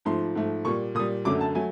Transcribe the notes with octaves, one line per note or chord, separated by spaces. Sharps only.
G#2 F3 A3 C6
G#2 F3 A3
A#2 G3 C#6
A#2 G3 D#6
F#2 D3 F#3 A3 D6
A5
F#3 A3 G#5